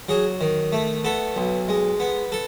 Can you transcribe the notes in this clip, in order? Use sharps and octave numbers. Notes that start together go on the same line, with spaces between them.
F#3 G#4
D#3
A3
B3 A4
B1
G#3
B3
A4